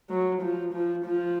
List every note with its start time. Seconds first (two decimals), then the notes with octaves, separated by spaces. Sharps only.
0.10 F#3
0.41 F3
0.73 F3
1.05 F3